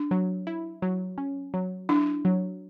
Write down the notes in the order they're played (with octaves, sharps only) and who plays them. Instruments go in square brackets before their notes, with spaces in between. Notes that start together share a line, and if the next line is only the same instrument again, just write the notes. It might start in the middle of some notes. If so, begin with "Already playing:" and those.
Already playing: [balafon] D4
[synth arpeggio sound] F#3
E4
F#3
C#4
F#3
[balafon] D4 [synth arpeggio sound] E4
[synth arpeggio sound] F#3